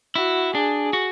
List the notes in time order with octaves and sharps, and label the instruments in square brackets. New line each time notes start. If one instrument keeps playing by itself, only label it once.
[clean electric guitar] E4 [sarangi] F#4
[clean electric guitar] D4 [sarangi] G#4
[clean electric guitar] F#4